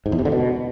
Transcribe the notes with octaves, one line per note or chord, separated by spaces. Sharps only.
G#2
E2
C3
D3
B2